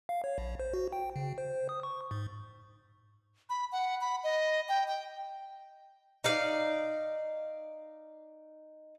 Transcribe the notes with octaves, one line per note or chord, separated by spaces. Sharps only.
F5
C#5
A#1
C5
F#4
G5
C#3
C5
D#6
C#6
G#2
B5
F#5
B5
D#5
G5
G5
D#4 D5 F5